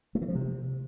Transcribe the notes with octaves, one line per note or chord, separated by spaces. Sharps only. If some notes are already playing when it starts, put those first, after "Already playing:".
A3
E3
F3
C3